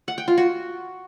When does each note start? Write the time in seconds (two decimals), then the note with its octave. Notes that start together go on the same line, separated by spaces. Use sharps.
0.08 F#5
0.18 G5
0.28 F4
0.38 F#4